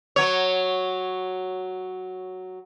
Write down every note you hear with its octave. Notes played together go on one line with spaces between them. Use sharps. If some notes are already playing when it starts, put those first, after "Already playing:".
F#3 C#5